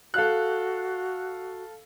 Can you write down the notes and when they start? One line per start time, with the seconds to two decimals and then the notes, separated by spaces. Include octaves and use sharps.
0.14 F#4 A4 F5 F#6